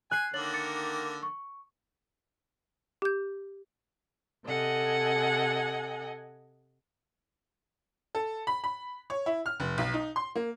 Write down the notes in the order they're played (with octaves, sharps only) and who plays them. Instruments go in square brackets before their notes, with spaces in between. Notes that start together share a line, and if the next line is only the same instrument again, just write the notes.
[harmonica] G#5 [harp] F#6 C7
[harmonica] D3 D#3 A#3 [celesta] C#5 A6 F#7
[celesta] D6 A6 C#7
C#6
[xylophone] G4 G6
[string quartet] C3 A4 D#5 F#5 G#5
[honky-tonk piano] A4
B5
B5
C#5
E4
F6
F1
B1
D#4
C6
A#3